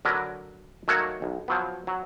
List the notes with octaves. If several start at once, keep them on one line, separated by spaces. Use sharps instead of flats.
D3 F#3 A#4 B4
D#3 F#3 A3 A#3 F#4 C#5
B1
F3 F#3 B3
F#3